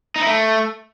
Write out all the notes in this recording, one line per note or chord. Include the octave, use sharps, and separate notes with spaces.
D#4
E4
A3